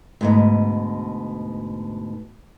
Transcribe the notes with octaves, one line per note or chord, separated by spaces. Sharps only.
D2 G#2 B2